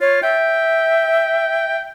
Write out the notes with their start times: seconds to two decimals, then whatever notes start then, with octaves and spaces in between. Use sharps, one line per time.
0.01 F4 C#5
0.23 E5 G5